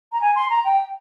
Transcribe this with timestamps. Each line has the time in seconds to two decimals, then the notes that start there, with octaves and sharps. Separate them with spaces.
0.12 A#5
0.21 G#5
0.36 C6
0.50 A#5
0.64 G5